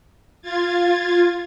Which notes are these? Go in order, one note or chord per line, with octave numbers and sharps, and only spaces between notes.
F4 G#6 A6